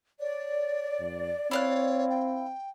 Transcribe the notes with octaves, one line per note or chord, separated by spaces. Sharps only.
C#5 D5
F2
C4 E4 C#5 F5 F#6
G5